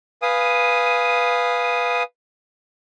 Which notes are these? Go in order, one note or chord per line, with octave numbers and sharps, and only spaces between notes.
B4 F5 G#5 D#6